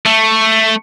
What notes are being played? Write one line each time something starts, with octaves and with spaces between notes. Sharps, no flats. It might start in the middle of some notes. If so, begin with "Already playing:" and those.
A3